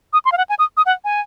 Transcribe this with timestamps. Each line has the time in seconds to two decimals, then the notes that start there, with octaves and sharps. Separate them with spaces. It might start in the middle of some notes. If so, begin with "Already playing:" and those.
0.13 D#6
0.25 C6
0.32 F5
0.38 F#5
0.49 G#5
0.59 D#6
0.77 D#6
0.86 F#5
1.04 G#5